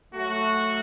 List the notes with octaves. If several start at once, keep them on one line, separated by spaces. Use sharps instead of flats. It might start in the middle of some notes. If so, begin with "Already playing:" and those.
F#3 A3 F#4